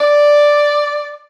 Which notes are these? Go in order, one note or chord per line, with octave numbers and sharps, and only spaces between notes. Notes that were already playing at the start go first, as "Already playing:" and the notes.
D5